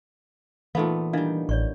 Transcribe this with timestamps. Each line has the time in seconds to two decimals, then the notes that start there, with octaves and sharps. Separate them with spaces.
0.75 A#2 E3 A3 B3 D#4 F5
1.13 D#3 G3 D4 E4 F5
1.49 A1 C#5 D5 C#6